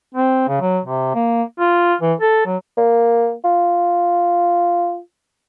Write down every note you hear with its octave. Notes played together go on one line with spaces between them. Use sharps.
C4
C#3
F#3
C3
A#3
F4
E3
A4
F#3
A#3
F4